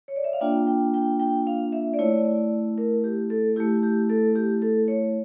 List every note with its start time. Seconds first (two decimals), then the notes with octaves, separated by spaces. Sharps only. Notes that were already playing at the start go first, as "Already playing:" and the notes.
0.08 C#5
0.16 D5
0.24 E5
0.33 F5
0.41 A#3 D4 F4 G5
0.67 G5
0.94 G5
1.19 G5
1.47 F5
1.72 E5
1.94 D5
1.99 A3 E4 C#5
2.25 D5
2.78 A#4
3.04 G4
3.30 A4
3.56 E4 G4
3.60 A3
3.83 G4
4.10 A4
4.36 G4
4.62 A4
4.88 C#5